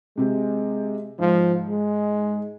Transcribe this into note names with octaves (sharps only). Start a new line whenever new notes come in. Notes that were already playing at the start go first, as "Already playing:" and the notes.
C3 G#3 C4 G4
G#2 F3
G#3